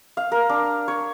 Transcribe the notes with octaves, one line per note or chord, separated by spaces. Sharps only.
F5
A#4
D4
C#5